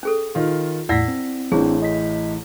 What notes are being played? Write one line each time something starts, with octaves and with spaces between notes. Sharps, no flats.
C#4 G#4 A4
D#3 F4
E2 A2 E4 D5 F#5 E6 A#6 B6
C4
A1 A2 E3 C4 D4 G#4
D#5 B6